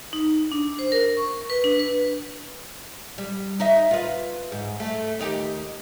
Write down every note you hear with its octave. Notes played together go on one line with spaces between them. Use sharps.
D#4
D4
C5
A#4
C#6
B4
D4
B4
G3
D#4 D#5 E5
F4 B4
G#2
A3
D#2 D#4 G4